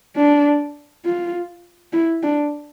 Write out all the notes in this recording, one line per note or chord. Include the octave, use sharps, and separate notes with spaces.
D4
F4
E4
D4